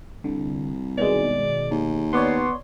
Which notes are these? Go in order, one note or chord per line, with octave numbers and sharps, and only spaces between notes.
C2 D3
B2 D#3 G#3 D5
D#2
B3 C#5 D5 C6